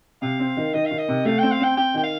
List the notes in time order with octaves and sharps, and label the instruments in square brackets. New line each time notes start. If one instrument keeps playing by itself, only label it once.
[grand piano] C3 [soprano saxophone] F5
[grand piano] C4
D#3
[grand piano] D#3 [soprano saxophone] D#5
[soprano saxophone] F5
[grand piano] D#3
[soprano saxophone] D#5
[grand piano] C3
[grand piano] A3 [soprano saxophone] F5
[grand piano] C4 [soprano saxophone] G5
[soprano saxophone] F5
[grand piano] C4 [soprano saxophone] G5
[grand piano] C4 [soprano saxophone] G5
[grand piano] D#3 [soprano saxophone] G5
[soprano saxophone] F5